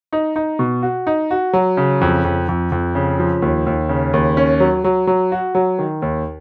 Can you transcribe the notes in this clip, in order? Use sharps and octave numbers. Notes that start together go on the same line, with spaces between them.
D#4
D#4
B2
F#4
D#4
F#4
F#3
C#3
F2
F2
F2
F2
C#3
F3
D#2
D#2
C#3
D#2
C#4
F#3
F#3
F#3
F#4
F#3
D#3
D#2